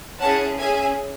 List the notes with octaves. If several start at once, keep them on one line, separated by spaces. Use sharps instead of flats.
C#4 E4 G#4 F#5 A5
C#4 G#4 E5 G#5